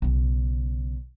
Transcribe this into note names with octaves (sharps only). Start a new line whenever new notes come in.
B1 C#3